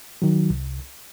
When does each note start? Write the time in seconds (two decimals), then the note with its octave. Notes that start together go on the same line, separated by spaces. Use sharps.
0.22 D#3 F#3
0.50 C2